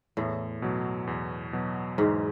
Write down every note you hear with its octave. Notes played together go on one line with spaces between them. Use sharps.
E2 A2
B2 F#3
E2
B2 F#3
E2 G#2